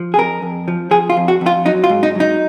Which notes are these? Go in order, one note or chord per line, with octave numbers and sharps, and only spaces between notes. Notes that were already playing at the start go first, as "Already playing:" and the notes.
Already playing: F3
G#4
F2 A#4
F2
F3
F3 G#4
F4
F2
F#4
F2
F4
F#3 D#4
F4
G#2
D#4
F#3 D#4